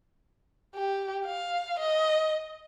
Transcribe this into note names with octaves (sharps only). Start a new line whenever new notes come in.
G4
F5
D#5